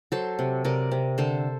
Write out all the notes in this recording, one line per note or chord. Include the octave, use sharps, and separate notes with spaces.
F#3 A4 C5
C3
C3 A#4 D5
C3
D3 A4 C5